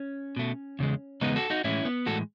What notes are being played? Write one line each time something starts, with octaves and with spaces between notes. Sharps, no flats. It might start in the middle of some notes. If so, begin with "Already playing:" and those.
Already playing: C#4
B2 A3
E2 C#3 G#3
E2 C#3 G#3 B3 D#4
F#4 A4
D#4 F#4
A2 E3 G#3 C#4 E4
B3
A2 E3 G#3 F#4 A4